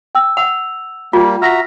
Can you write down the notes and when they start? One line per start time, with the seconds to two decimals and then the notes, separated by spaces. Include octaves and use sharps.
0.15 G5 E6
0.37 F#5 E6 F7
1.13 G3 A#3 F4
1.42 F#4 E5 A#5 F6 A#6 B6